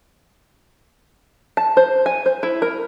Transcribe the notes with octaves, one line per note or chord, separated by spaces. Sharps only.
A5
C5
G#5
C5
E4
A#4